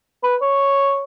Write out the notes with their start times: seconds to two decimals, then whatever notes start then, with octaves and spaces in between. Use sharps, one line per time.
0.23 B4
0.41 C#5